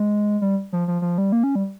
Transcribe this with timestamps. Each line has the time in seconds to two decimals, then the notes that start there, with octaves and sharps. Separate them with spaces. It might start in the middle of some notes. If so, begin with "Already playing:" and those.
Already playing: G#3
0.41 G3
0.73 F3
0.88 F3
1.02 F3
1.18 G3
1.32 A#3
1.43 C#4
1.55 G3